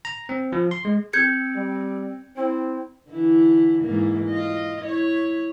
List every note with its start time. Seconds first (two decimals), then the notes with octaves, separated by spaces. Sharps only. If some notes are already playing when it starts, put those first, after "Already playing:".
0.05 A#5
0.29 C4
0.52 F3
0.71 C6
0.85 G#3
1.13 C4 G6 G#6 C#7
1.55 G3
2.36 C4 E4
3.09 D3 E3 E4
3.83 G#2 E3 A#3
4.29 F4 D#5
4.81 E4 C#5